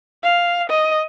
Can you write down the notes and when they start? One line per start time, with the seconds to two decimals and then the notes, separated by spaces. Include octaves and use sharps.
0.23 F5
0.69 D#5